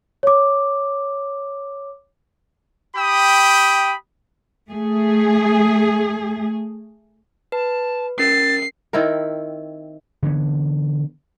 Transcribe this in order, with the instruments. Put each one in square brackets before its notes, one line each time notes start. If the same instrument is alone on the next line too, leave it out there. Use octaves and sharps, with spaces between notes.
[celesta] C#5 D6
[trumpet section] G4 G5 B5 D#6
[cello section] A3 G#4
[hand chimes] B4 [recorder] A5
[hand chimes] C#4 A#4 [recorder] A6 [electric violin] C7
[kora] D#3 C4 E4 A#4
[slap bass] D3 E3 B3